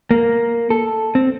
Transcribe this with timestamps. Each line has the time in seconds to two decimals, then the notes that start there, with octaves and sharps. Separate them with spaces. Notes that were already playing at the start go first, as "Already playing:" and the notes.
0.11 A#3
0.70 A4
1.15 C4